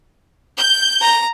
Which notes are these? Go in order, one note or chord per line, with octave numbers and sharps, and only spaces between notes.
G6
A#5